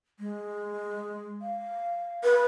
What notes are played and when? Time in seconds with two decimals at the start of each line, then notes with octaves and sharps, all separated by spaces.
0.19 G#3
1.42 F5
2.24 B4